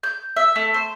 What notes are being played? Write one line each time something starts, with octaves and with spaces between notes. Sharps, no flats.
G6
E5
A3
C5